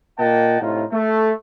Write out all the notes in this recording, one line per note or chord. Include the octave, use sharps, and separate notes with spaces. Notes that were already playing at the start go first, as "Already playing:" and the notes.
A#2 A#3 D#5 F#5 G5 A5
A2 C3 D#4 F4
A3